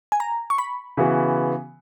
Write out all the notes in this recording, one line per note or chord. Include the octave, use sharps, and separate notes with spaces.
G#5
A#5
C#6
B5
C#3 E3 B3 F#4